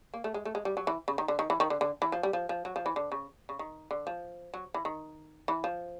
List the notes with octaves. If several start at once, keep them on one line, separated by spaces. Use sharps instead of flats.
A#3
A3
G#3
A3
G#3
G3
F#3
E3
C#3
D#3
D3
D#3
E3
D#3
D3
D3
E3
F3
G3
F3
F3
F#3
F3
E3
D3
C#3
C#3
D#3
D3
F3
F#3
E3
D#3
E3
F3